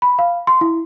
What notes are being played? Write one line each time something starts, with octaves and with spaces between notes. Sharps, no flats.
B5
F5
C6
E4